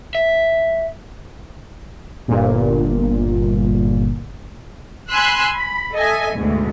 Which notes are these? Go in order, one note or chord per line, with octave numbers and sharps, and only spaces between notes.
E5
G1 A#2
G#5 B5 C6 E6 F#6
B5
A4 D#5 E5 G#5
D2 G#2 B2